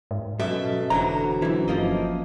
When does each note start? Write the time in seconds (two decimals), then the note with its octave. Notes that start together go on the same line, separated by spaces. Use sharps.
0.11 G#2
0.40 F#2 B2 F#3 A4 E5
0.90 F1 D3 E3 F#3 C5 A#5
1.42 F#2 E3 E4
1.68 G1 F3 A#3 D#5